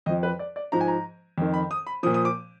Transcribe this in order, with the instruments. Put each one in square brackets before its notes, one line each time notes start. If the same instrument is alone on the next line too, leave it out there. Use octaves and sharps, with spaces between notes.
[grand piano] F2 F3 D#5
B4
D5
D5
G#2 F3 A#5
G#5
A#5
F2 D#3
B5
D#6
B5
F3 D#6
A#2
D#6
D6